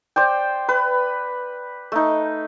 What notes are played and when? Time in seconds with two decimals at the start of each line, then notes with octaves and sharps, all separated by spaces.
0.16 C5 D5 G5
0.69 B4
1.92 A3 D#4